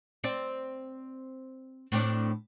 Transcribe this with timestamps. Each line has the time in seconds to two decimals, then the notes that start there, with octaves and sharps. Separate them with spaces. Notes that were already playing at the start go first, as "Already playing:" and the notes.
0.24 C4 D5
1.92 A2 C4 D4